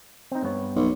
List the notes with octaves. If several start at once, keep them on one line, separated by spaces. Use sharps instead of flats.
C4 D#4
G2 B3 C#5
B1